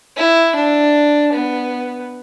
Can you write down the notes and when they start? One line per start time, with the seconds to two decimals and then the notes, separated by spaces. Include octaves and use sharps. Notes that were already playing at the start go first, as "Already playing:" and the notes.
0.17 E4
0.55 D4
1.32 B3